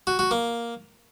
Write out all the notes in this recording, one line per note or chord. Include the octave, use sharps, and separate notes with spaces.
F#4
F#4
A#3